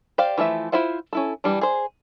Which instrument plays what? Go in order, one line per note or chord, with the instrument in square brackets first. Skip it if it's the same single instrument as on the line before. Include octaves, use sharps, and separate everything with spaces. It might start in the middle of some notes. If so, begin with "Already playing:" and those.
[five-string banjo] G4 C5 D5 F5
E3 F3 A3 E5
E4 F4 C5 E5 F#5
C#4 E4 A4
E3 G3 D4
G#4 C5